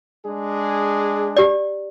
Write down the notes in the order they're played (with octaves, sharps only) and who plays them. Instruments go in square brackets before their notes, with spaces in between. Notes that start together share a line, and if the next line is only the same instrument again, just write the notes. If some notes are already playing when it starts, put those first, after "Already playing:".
[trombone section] G#3 D4 G#4
[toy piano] G4 D5